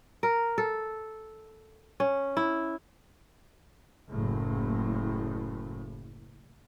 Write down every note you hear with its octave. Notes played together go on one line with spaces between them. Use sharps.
A#4
A4
C#4
E4
F#1 A2